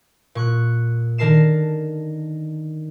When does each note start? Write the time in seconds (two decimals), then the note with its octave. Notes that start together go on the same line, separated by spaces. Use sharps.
0.35 A#2 C#6 F#6
1.18 D3 D#3 A#4 A5 C7 E7